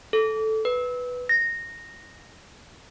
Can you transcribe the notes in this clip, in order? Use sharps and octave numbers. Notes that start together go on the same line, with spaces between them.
A4
B4
A#6